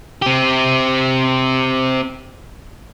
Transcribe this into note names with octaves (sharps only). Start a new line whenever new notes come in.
C4 G4